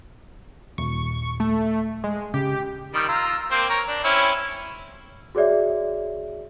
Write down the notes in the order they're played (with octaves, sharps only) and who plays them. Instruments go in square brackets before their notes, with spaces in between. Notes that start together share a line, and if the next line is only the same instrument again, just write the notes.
[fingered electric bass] D#1 [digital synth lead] C#6
[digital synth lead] A3
G#3
[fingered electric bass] C#3 [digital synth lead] G4
[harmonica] D#3 G3
F4 A#5 E6
A#3 C4 C5
A#4 C#5
D4
C4 C#4 E4
[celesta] F#4 G#4 C#5 D5 E5